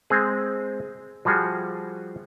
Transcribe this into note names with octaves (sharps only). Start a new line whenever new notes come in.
G#3 C4 G#4
F3 G3 F#4 G#4